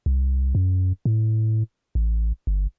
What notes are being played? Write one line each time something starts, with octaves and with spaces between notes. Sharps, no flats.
C2
F#2
A2
A1
G1